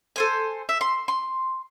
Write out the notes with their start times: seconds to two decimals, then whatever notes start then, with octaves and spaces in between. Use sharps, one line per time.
0.16 A4 C5 G#5
0.69 E5
0.81 C6
1.08 C6